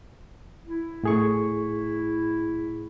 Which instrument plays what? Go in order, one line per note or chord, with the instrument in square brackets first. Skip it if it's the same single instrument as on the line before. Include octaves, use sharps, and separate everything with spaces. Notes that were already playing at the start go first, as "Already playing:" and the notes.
[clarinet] E4
[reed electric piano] A2 G#4 C#6